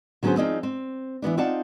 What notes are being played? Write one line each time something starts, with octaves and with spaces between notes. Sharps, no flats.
D3 F#3 B3 C#4 G#4 C5
F3 C4 D#4 G#4 D5 D#5
C4
E3 F3 B3 D4
C4 D#4 F4 D5 F#5 A5